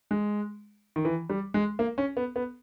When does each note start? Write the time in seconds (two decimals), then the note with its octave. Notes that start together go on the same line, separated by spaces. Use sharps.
0.11 G#3
0.96 D#3
1.05 E3
1.30 G3
1.54 G#3
1.79 A#3
1.98 C#4
2.17 B3
2.36 B3